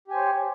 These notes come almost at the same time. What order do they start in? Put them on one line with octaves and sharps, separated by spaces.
G4 G#5 C5 C#5